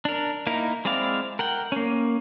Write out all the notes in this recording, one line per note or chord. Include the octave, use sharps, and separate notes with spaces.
D4 A#4
A#3 D#4 E4 A#4
G#3 C4 E4 D5 F5
A#4 F#5 G5
A#3 C#4